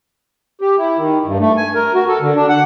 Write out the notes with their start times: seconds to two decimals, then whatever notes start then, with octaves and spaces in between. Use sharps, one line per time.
0.61 G4
0.78 E4
0.97 D#3
1.25 G2
1.40 A3
1.57 G#5
1.75 A#4
1.94 F#4
2.09 A4
2.21 D3
2.36 D4
2.49 F#5